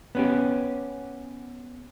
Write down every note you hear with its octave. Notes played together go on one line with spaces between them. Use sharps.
B3 C#4 G4